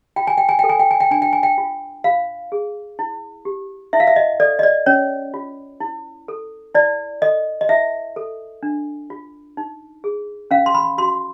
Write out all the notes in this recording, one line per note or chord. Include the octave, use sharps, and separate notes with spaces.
F4 G5
G#5
G5
G#5
A4 G5
G#5
G5
G#5
G5
D4 G#5
G5
G#5
G5
F4
F4 F5
G#4
E4
G4
E4 E5
F5
E5
D#5
A4 D5
D#5
D5
C#4 C#5
F4
E4
A4
E4 D5
A4 D#5
D#5
E4 E5
A4
D4
F4
D#4
G#4
C#4 F5
C6
B5
F#4 C6